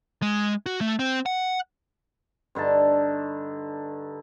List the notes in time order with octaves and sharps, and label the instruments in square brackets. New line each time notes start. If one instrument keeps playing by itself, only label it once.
[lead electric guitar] G#3
F#4
A3
C4
F#5
[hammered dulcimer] G2 D3 D#4 A5